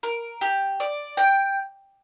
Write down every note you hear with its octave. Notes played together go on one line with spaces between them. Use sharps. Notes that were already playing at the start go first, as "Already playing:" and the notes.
A#4
G4
D5
G5